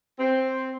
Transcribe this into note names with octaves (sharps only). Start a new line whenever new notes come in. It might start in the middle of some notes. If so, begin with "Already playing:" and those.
C4